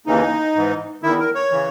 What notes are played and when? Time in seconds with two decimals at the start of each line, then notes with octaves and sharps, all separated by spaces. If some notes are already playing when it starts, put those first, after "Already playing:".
0.06 D#2 C#3 E3 D#4
0.55 G#2 E3
1.03 E2 D#3 E4
1.19 A#4
1.35 C#5
1.51 C#3 E3